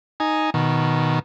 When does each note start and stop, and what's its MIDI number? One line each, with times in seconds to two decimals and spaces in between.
0.20 0.50 63
0.20 0.50 80
0.54 1.19 47
0.54 1.19 51